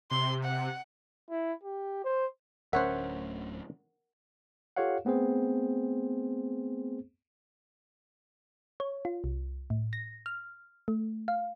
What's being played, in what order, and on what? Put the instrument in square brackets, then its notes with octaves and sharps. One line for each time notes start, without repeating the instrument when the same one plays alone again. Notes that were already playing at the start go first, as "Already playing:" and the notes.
[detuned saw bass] C3 [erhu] C6
[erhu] F#5
[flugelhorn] E4
G4
C5
[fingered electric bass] D1 D2 C#4 [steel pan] A#4 F#5 [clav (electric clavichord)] C5 C#5 E5
[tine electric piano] F4 G4 A4 C#5 F5 F#5
A3 B3 C4 G#4 C5
[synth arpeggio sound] C#5
F4
C2
A2
A#6
F6
A3
F5